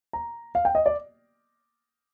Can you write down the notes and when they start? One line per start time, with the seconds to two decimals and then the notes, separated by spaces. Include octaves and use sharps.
0.13 A#5
0.55 F5
0.65 G5
0.75 D#5
0.86 D5